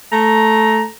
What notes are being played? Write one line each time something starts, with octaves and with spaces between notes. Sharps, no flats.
A3 A#5